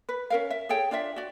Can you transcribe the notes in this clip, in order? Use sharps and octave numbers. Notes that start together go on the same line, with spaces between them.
B4
C#4 A#4 F5
E5
G#4 A4 C#5 G5
D4 F4 D5 E5
F#4 D5